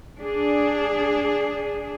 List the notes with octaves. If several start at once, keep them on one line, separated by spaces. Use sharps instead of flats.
D4 G#4